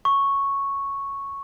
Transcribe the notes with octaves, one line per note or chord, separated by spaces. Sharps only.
C#6